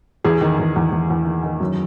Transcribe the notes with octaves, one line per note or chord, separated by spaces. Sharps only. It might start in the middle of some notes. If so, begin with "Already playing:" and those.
E2 G#4
D#3
E2
E2
E2
E2
D#3
D#3
F#2